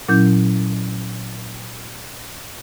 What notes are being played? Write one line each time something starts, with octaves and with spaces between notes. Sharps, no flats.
A#2 F#3 C#4 E4 G6